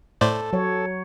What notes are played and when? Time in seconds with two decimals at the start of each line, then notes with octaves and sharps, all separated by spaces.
0.21 A2 A4 C5 D5
0.53 F#3 C#5